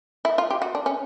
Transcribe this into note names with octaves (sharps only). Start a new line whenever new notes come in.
E4
F4
G4
F#4
D4
C#4